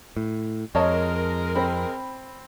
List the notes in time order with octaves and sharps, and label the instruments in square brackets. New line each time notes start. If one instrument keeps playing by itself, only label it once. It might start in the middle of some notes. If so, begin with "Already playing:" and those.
[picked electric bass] A2
[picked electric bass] F2 [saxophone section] G#3 A#4 [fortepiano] C#5 D#5 A5
[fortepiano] C4 B5